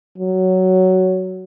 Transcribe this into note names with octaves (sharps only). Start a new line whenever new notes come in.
F#3